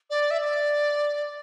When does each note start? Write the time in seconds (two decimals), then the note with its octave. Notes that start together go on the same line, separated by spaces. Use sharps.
0.10 D5
0.31 E5
0.41 D5